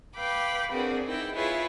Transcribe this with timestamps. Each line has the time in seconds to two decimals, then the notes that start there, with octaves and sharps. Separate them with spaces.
0.16 B4 F5 G5 B5 D6
0.71 C4 D4 F#4 G#4 A#4 B4
1.04 D#4 E4 G5
1.34 E4 F4 G#4 B4 C#5 E5